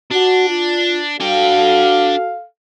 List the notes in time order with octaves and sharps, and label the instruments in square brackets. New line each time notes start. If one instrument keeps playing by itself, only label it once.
[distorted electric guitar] D4 [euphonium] F#4
[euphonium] F4
[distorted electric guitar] D4 G5 [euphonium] F#4 [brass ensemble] A4 F5